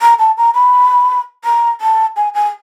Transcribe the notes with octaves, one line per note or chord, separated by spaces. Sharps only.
A#5
A5
A#5
B5
A#5
A5
G#5
G#5